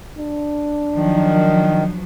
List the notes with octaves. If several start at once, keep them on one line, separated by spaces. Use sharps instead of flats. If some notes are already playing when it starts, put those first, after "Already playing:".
D4
D#3 F3 F#3